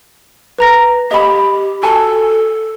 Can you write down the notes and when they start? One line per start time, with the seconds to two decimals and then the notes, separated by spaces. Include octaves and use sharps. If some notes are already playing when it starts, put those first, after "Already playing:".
0.58 B4 A#5 A#6
1.11 G4 D#5 B5
1.83 F#4 A4 G#5 A5